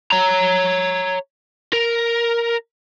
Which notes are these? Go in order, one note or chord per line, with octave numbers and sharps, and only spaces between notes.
C#5 A#5
A#4